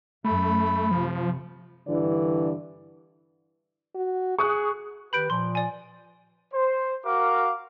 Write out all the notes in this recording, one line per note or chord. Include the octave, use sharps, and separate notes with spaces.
F#2 A3 B5
C3 F3
G2 D3 E3 D5
F#4
G#4 C#6 D#6 F#6
D#3 G4 B4 B5 G6 D7
A#2 F3 C6
D5 G#5
C5
F#4 A#4 F5 D6